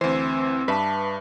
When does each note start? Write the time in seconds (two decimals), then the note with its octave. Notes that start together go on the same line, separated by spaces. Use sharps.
0.01 D2 E3 C4 C5
0.68 G2 B4 E5 A5 D6